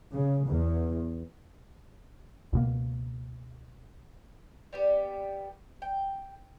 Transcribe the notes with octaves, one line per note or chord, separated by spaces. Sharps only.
C#3
E2
C#2 B2 A#3
G3 B3 G4
G5